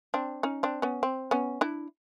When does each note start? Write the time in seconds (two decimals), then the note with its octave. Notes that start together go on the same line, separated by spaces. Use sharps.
0.14 C4 D4
0.43 C#4 D#4
0.63 C4 D4
0.82 B3 C#4
1.03 C4
1.31 B3 C#4
1.61 D4 E4